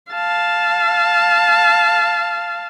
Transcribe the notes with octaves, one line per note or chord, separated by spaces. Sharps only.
F5 A5